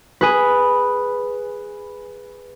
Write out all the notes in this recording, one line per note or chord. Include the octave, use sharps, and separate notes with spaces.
G#4 B4